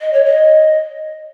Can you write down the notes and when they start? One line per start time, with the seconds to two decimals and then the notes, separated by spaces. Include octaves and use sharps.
0.01 D#5
0.13 C#5
0.25 D#5